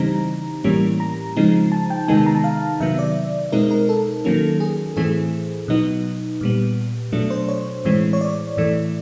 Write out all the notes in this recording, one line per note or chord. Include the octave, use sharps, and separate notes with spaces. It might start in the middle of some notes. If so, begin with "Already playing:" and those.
Already playing: C#3 E3 G3 C4 D#4 A#5
A2 E3 G3 A#3 C#4
A#5
C#3 F3 G#3 C4 D#4
A5
G5
C3 D#3 G#3 B3 D#4 G#5
A5
A#5
A5
F5
C3 D#3 F#3 B3 E5
D5
B2 G#3 C4 D#4 A#4
A#4
A4
D#3 F#3 A#3 C#4
G#4
A2 E3 A3 C4 G#4
B2 F#3 B3 D#4
A#2 G3 B3
B2 F#3 A3 D4
C5
C#5
A2 E3 G#3 C4
C#5
D5
A2 E3 A3